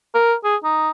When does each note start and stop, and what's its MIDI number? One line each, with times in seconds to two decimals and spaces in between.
0.14 0.34 70
0.44 0.56 68
0.64 0.90 63